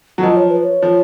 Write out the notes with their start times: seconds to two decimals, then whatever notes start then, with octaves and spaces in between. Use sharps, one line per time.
0.18 F#3
0.23 F3 D#5
0.36 C#5
0.50 B4
0.63 C#5
0.82 F3